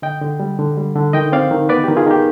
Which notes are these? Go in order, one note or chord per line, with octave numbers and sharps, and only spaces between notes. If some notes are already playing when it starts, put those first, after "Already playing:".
D3 D#5 G5
D3
G3
D3
G3
D3
D#3 D#5 G5
C4 D5 F5
D#3
B3 B4 D5
D#3 G4
F4 G#4
D#3 G4